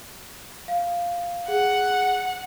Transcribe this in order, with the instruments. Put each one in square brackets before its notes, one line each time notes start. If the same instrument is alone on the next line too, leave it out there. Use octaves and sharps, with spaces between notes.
[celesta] F5
[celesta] G#4 [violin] F#5